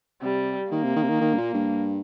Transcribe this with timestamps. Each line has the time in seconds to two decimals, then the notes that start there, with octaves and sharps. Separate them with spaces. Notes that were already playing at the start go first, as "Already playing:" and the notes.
0.22 C3 G3
0.71 D#3 A#3
0.84 C3
0.96 D#3
1.03 C3
1.09 D#3
1.21 D#3
1.34 G2
1.37 A#2
1.54 G2